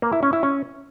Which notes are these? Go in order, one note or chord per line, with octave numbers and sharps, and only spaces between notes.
A#3
E4
C#4
E4
C#4